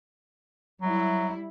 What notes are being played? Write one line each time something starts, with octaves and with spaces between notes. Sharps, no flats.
F#3 G3 E4